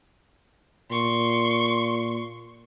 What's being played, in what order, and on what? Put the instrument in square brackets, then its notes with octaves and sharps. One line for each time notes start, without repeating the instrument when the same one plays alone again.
[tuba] A#2 [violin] C6 C#6